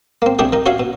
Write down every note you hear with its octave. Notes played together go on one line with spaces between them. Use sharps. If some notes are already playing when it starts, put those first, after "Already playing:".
A#3 C4
C2 A3 D4 G#4 G5
D#3 D#4
C#4 F#4 C#5 E5 F5
B2